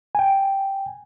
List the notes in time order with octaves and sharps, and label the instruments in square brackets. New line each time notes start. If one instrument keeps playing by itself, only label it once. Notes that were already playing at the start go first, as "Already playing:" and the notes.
[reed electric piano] G5 G#5